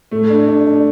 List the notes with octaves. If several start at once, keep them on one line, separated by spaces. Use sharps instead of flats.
A2 A3
D4
D4
D4